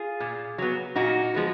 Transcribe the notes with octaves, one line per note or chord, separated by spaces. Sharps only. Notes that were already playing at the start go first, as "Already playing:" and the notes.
Already playing: F4 G#4
A#2
F#3 B3
A#2 D#4 F#4
F3 G#3 B3